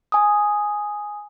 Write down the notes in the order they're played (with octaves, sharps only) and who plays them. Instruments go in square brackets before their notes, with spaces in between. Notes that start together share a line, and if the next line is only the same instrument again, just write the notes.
[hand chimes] G#5 D#6